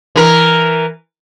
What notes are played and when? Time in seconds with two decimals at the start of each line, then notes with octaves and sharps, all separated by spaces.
0.16 E3 A#4